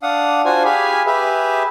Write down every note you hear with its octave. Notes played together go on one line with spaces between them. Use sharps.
D4 F5 F#5 D#6
D4 F4 F#4 C5 G#5
G4 G#4 F5 G#5 B5
G4 G#4 B4 E5